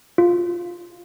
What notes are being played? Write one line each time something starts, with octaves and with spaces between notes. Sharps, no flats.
F4